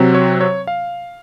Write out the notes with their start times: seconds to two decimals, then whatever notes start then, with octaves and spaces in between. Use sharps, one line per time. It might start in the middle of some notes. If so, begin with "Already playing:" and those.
Already playing: C3 F#3 C4
0.15 C#5
0.41 C#5
0.67 F5